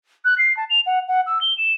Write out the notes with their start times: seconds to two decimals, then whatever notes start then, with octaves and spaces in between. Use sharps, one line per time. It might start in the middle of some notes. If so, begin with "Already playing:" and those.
0.25 F#6
0.38 C7
0.57 A5
0.70 F7
0.86 F#5
1.08 F#5
1.26 E6
1.41 G7
1.57 E7